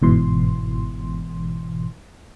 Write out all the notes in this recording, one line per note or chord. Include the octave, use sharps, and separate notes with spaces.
G1 G#2 B2 E3 C6